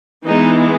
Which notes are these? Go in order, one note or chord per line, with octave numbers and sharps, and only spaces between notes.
E3 G#3 B3 D#4